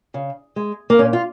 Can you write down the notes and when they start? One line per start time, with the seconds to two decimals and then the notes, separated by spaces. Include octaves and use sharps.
0.14 C#3
0.56 G#3
0.90 A#3
0.99 A#2 C#4
1.13 F4